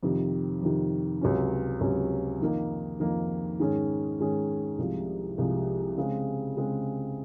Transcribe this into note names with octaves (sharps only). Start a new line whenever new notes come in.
F2 C3 D#3
F2 C3 D#3
C#2 C3 F#3 C#4
C#2 C3 F#3 C#4
F2 D#3 A#3 D#4
F2 D#3 A#3 D#4
G#2 D#3 G#3 C#4 G#4
G#2 D#3 G#3 C#4 G#4
C2 C3 F3 G#3
C2 C3 F3 G#3
C#3 G#3 C4
C#3 G#3 C4